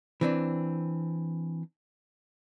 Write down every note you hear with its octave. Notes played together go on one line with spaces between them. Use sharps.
E3 C4 D4